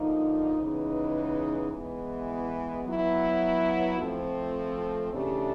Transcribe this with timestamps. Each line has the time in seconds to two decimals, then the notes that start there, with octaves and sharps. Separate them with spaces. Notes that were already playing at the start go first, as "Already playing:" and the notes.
Already playing: D3 F3 A#3 D#4
0.58 C#3 E3 G#3 B3 D#4
1.72 E3 G#3 B3
2.85 F#3 B3 E4
3.98 F3 A3 C4
5.12 C#3 E3 A3 D4 G4